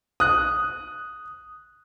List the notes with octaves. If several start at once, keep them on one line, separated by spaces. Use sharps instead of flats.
D#6 F#6